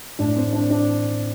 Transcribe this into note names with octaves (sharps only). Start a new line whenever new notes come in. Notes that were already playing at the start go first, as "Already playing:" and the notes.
A2 D4
C4
D4
D4